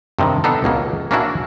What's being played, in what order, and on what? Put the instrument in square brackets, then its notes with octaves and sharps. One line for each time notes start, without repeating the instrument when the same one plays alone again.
[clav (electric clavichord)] G2 C3 D#3
B3 D4 D#4 A4
C#2 B2 A#3
A#3 C#4 D4 E4 F#4